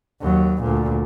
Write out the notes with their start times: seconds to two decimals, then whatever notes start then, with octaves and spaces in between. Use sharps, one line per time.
0.21 D#2 F#3
0.62 D2 A#2